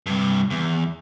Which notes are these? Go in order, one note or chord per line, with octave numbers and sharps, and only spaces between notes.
G2 C3
E2